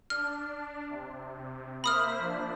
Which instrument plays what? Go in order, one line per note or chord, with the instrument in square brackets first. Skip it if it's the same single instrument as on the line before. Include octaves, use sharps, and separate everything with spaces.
[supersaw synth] D4 [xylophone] F6
[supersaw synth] C3
[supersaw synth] A#3 C5 E5 [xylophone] B5 D#6 F6
[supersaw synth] F3 D4